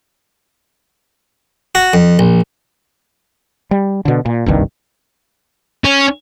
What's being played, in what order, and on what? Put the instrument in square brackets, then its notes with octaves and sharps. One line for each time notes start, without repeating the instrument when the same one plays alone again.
[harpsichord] F#4
F2
A#1
[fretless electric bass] G3
B2 D3
A#2
F#1 C2 G2 D#3
[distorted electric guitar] C#4